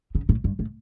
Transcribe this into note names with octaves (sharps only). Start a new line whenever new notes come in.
C#3
A2
G2
A2